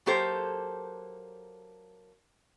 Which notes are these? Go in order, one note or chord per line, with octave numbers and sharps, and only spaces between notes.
F#3 A#3 G4 A4 C5